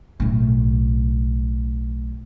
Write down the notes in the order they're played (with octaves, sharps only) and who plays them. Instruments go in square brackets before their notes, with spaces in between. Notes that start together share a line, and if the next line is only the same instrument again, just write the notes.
[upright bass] B1 A2